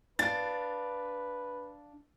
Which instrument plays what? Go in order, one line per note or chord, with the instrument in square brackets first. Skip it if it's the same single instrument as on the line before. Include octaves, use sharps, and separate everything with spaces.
[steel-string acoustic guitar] D4 F5 [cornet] B4 [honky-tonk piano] A6